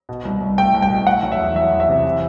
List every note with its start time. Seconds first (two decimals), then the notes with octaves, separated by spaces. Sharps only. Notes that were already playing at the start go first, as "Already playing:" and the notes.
0.09 B2
0.25 C2
0.41 C2
0.58 A3 G5
0.74 C2
0.82 G5
0.90 B2
1.07 A3 F#5
1.23 F#3
1.32 E5
1.39 E2
1.56 F#3 E5
1.72 E2
1.80 E5
1.89 C3
2.05 E3